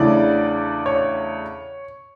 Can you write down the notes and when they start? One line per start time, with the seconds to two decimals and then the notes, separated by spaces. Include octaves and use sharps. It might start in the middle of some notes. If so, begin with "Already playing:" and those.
Already playing: E2 C#3 E3 A3 D4 D5
0.86 C#5